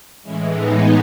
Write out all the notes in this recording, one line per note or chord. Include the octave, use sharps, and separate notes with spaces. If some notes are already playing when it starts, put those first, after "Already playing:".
A2 E3 G#3 C#4 E4
B3 D#4